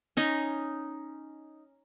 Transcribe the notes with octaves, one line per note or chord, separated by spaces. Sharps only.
C#4 D#4